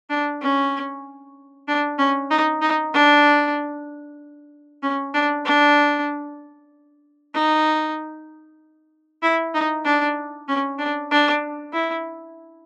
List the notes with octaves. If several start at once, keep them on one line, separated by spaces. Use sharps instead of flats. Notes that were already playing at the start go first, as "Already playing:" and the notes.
D4
C#4
D4
C#4
D#4
D#4
D4
C#4
D4
D4
D#4
E4
D#4
D4
C#4
D4
D4
E4